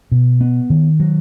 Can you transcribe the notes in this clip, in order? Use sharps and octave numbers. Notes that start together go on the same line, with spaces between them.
B2
B3
D#3
F#3